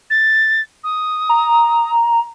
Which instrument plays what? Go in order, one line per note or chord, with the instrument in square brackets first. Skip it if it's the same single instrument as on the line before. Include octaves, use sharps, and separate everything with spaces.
[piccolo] A6
D#6
[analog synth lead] A#5